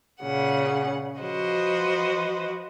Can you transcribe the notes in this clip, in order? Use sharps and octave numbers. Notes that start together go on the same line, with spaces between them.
A#2 C#3 F#5
F3 F#4 B4 C5 D#5